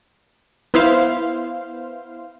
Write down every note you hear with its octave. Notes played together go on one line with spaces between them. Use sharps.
B3 E4 C5 F5